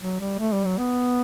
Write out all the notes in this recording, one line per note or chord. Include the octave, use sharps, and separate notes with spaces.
F#3
G3
A3
G3
F#3
B3